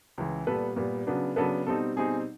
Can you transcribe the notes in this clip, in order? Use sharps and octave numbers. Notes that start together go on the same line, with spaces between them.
C#2 C#3 E3
A#2 G3 B3 A4 B4
A#2 G3 B3
C#3 F#3 B3 D4
C#3 F#3 B3 D4 A4 B4
B2 G3 C4 D#4 A4
B2 G3 C4 D#4 G#4